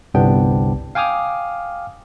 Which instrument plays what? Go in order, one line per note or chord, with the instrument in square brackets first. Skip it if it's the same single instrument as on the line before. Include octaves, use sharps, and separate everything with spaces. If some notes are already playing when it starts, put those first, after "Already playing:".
[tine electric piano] G1 C2 C3 B3 D4 G5
F5 G5 G#5 D6 D#6 F6